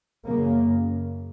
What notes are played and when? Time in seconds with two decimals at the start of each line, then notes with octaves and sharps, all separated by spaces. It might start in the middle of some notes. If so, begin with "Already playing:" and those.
0.24 F#2 C#3 A#3